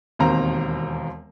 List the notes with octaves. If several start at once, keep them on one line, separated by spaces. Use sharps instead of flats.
E1 D#2 D#3 C4 C5 A#5